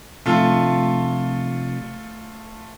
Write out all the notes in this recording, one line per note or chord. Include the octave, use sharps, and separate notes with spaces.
C3 F3 A3 D4 F4 A4